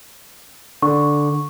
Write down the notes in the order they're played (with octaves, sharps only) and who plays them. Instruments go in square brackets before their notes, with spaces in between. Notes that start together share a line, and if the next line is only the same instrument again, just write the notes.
[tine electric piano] D3 [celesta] C#6